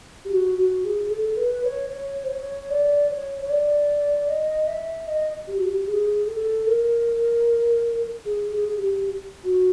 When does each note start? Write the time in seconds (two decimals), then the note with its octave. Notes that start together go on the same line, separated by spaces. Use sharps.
0.25 G4
0.32 F#4
0.58 F#4
0.85 G#4
1.11 A4
1.37 B4
1.64 C#5
1.90 C#5
2.24 C5
2.30 C#5
2.70 D5
3.09 C#5
3.42 C#5
3.49 D5
4.28 D#5
4.67 E5
5.07 D#5
5.48 G4
5.58 F#4
5.68 G4
5.88 G#4
6.26 A4
6.67 A#4
8.25 G#4
8.52 G#4
8.68 G#4
8.78 G4
9.44 F#4